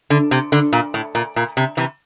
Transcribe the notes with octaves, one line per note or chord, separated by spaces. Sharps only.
D3
C3
D3
A#2
A2
A#2
A#2
C3
C3 E3